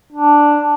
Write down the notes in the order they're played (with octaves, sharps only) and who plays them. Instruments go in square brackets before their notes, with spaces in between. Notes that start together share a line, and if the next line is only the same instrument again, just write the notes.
[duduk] D4